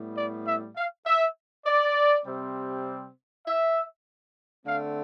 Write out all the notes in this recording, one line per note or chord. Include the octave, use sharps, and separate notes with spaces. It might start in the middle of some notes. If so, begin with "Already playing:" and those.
Already playing: A2 G3 B3
D5
E5
F5
E5
D5
C3 G3 C4
E5
D3 A3 C4 F5